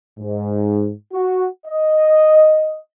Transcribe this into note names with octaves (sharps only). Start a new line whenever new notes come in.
G#2
F#4
D#5